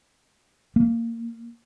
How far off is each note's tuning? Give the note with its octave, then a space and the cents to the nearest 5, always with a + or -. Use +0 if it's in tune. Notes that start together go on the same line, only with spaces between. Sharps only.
A#3 -15